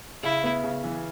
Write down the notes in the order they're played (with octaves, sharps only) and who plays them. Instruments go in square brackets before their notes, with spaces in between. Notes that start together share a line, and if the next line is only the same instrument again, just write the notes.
[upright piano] C#3 [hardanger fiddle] E4
[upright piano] B3
C#3
E3